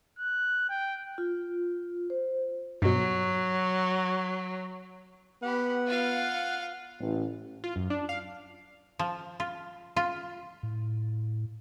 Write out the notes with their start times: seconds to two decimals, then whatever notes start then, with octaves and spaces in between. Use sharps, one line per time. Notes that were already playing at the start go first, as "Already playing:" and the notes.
0.19 F#6
0.69 G5
1.18 F4
2.10 C5
2.82 G2 B2 F#3
5.43 B3 G4 F#5 B5
5.87 F4 F5
7.00 A1
7.64 F4
7.76 F#2
7.90 D4
8.09 F5
8.99 F3
9.40 F4
9.96 F4
10.63 A2